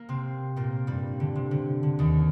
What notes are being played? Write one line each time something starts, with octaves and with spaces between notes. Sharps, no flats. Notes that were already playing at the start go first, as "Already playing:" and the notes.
Already playing: A#3
C3 C4
A#2 A#3
G2 G3
D3
C3
D3
D3
D#2 D#3